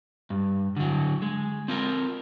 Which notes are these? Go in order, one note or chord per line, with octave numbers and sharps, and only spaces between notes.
G2
D3 F#3
G#3
C4 F4 A#4